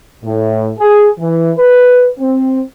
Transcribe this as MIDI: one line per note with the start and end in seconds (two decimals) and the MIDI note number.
0.24 0.72 45
0.79 1.08 68
1.19 1.51 52
1.57 2.08 71
2.20 2.61 60